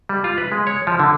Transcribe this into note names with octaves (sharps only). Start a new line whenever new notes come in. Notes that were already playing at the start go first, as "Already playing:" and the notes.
G3
F4
B4
G#3
C#5
F3
D3